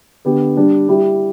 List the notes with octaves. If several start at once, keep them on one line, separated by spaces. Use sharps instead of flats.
D3 B3 G4
G3 D4 G4
G3 E4 G4